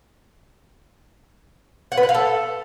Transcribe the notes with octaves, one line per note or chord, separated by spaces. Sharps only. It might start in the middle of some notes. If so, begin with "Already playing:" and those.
F#5
B4
F#5
F5
A4